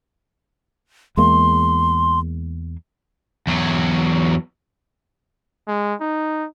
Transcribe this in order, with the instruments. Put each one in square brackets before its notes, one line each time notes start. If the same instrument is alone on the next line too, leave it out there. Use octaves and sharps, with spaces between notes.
[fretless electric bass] E2 G#3 A#3 [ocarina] C6
[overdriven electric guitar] E2 F#3
[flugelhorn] G#3
D#4